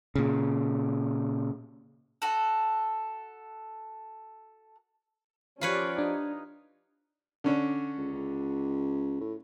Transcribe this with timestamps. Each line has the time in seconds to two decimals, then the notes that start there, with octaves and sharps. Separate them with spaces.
0.16 A#2 C#3
2.22 F#4 A4
5.61 F3 C#4 F4 G4 B4 C#5 D5
5.99 D4 D#4
7.44 D3 C#4 D4
7.97 C#2
8.13 C#2
9.20 A2